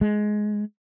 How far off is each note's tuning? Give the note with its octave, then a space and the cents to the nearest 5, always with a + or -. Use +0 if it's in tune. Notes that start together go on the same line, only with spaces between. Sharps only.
G#3 +15